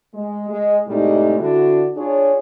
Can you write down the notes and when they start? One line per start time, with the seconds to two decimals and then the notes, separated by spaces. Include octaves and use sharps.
0.14 G#3
0.50 G#3
0.88 A2 C3 G3 G#3 D#4
1.40 D3 D4 E4 F#4
1.97 D4 F4 G#4 C#5